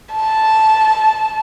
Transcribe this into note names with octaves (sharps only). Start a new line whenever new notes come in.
A5